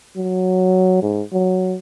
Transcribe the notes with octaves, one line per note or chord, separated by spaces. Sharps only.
F#3
G#2
F#3